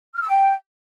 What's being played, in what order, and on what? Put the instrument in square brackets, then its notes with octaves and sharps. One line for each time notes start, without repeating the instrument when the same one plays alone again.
[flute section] F6
E6
G5